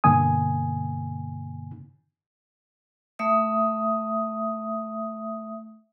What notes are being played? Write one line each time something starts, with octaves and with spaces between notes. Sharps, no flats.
G2 B2 D3 A#3 G#5 D#6
A3 E5 D#6